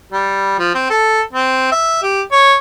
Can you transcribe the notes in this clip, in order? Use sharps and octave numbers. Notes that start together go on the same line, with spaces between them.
G3
F3
C4
A4
C4
E5
G4
C#5